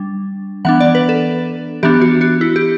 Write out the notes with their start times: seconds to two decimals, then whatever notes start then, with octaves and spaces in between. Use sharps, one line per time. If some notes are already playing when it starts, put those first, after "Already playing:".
Already playing: G3 D4
0.65 E3 B3 D4 F#5
0.80 D5
0.95 B4
1.09 A4
1.83 E3 B3 D4 G4
2.01 F#4
2.21 F#4
2.41 E4
2.56 G4